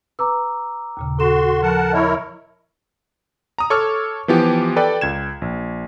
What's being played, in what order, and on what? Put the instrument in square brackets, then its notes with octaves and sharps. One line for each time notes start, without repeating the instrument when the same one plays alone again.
[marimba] B4 [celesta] A#5 D6 E6
[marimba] D#2 A#2 C#3
[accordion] F#4 C6 [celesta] A4 E7
[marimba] F3 [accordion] A#4 F#5 A5
[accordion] E4 A#4 C#5 [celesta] D#5 E5 A5
[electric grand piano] A#5 D#6
A4 C#5 C#6 D6 E6 F6
E3 F3 B3 F4 G4
A4 B4 D5 G5
C#2 G#6 E7
A#1